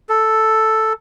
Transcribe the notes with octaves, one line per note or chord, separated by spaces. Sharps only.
A4